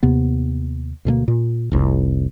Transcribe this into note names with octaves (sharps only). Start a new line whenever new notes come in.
D#2 C3 B3
D2 B2 G#3 A#3
A#2
F1 C2